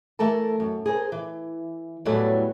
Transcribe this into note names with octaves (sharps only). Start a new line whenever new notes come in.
E3 A3 A4 A#4 A5
F#2
G#4 A#4 C5
E3
E2 A2 E3 F#3 G3 A3